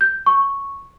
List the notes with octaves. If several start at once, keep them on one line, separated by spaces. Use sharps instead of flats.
G6
C#6